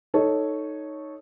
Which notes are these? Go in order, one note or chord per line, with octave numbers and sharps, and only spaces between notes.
D#4 A4 C#5